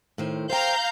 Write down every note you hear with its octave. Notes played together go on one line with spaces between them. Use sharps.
A2 D#3 C5
C5 F5 G5 A#5 G6